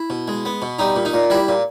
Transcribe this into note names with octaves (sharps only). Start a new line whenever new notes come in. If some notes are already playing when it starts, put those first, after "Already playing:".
Already playing: E4
B2
G#3
B3
B2
G3 D#4
A#2
D#4
A#2
G3 E4
A#2